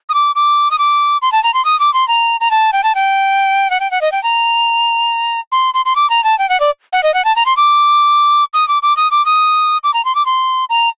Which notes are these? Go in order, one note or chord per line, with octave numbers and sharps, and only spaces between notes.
D#6
D6
D6
D#6
D6
C6
A5
A#5
C6
D#6
D6
C6
A#5
A#5
A5
G5
A5
G5
F#5
G5
F#5
D#5
G5
A#5
C6
C6
C6
D6
A#5
A5
G5
F#5
D5
F#5
D#5
F#5
A5
A#5
C6
D6
D#6
D6
D6
D#6
D6
D#6
D6
A#5
C6
D6
C6
A#5